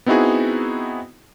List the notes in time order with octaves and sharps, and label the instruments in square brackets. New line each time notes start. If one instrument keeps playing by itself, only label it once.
[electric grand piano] B3 C4 D#4 E4 F#4 G#4